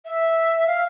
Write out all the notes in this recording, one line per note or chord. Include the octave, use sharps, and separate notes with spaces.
E5
F5